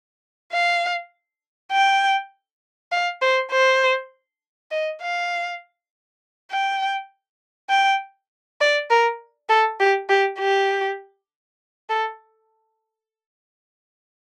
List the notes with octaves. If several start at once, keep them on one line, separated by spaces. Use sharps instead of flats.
F5
G5
F5
C5
C5
D#5
F5
G5
G5
D5
A#4
A4
G4
G4
G4
A4